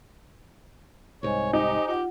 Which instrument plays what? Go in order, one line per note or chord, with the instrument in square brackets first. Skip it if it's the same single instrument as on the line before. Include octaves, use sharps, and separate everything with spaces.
[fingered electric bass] C2 G#2 [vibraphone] C5 D#5 G#5 [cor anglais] C#5
[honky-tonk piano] D#4 [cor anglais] G4
[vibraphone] F4 F#5 [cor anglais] G4